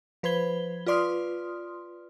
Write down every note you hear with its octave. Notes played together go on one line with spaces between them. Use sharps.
F3 B4 C5 B5 G#6 G7
F4 B4 D5 C6 D#6 F6